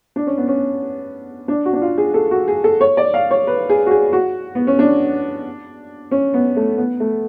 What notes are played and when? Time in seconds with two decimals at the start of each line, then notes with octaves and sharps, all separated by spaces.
0.16 D4
0.27 C#4
0.37 B3
0.48 C#4
1.48 D4
1.65 F#4
1.73 D4
1.82 F4
1.98 G#4
2.14 A4
2.31 F#4
2.48 G#4
2.64 A4
2.81 C#5
2.97 D5
3.14 F5
3.31 C#5
3.47 B4
3.69 G#4
3.87 F#4
3.91 G#4
4.13 F#4
4.55 B3
4.67 C#4
4.79 D4
6.11 C#4
6.34 B3
6.56 A3
6.78 B3
7.00 A3